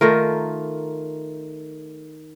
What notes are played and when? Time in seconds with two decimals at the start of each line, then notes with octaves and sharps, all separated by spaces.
0.01 D#3 A3 F4 A#4